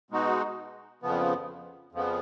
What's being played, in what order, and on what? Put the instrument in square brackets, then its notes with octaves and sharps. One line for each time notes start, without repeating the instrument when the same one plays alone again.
[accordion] B2 G#3 D#4 F#4
F2 C#3 F3 B3
F2 C#3 F3 B3